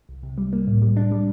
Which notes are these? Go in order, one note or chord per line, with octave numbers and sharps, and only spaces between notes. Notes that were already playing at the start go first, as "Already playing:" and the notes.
C2
C3
G3
A#3
A2
G3
D4
G3